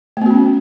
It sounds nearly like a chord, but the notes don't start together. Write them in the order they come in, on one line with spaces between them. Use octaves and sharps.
A3 B3 F#4 C#4